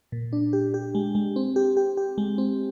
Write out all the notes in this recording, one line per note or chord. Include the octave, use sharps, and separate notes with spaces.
A#2
D4
G4
G4
G#3
G#3
C4
G4
G4
G4
G#3
C4